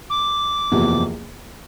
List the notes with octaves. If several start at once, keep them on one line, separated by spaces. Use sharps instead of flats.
D6
F#1 E2 C3 F3